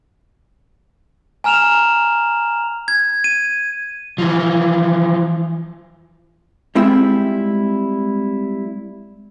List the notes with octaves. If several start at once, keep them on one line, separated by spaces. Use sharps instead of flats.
G#5 A#5 F6 E7 F7
G#6
D#7
E3 F3
G3 G#3 C4 E4 F4 E5